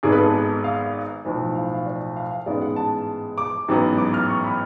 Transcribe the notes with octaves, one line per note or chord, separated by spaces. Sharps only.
G#1 G#2 G#3 B3 G#4
B4
A4
F5
B1 A2 F3
F5
F5
D5
F5
F5
A1 G#2 G#3 B3 D5
F#5
A5
D6
A1 G#2 F#3 B3
D6
F6
C#6
B5